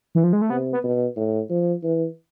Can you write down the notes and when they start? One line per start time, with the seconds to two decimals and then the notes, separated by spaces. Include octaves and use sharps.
0.15 E3
0.24 F3
0.33 G#3
0.42 A3
0.49 C3 B3
0.72 B3
0.84 B2
1.17 A2
1.50 F3
1.83 E3